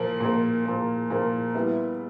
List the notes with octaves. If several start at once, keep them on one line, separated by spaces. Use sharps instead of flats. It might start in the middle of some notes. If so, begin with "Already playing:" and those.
Already playing: A#2 F3 A#3
A#2 F3 A#3
A#2 F3 A#3
A#2 F3 A#3
G3 B3 E4